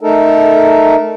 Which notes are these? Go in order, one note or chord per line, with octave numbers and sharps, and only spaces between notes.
A3 D#4 A4 A#4